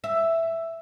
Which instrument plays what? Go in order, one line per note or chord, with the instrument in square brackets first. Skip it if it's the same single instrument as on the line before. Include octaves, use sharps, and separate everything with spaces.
[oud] E5